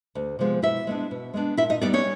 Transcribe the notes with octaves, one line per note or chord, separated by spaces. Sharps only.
D2
C3 F3 G#3 B3
B2 E4 E5
G#3 B3 D4
B2
G#3 B3 D4
A#2 E4 E5
D#4 D#5
G3 B3 D4 D#4 D5
C#4 C#5